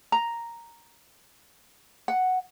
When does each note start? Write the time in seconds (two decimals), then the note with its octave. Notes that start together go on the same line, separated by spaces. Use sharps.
0.12 A#5
2.08 F#5